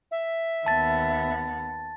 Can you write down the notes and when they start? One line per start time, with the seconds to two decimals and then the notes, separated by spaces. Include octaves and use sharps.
0.11 E5
0.66 D#2 B3 A5 A6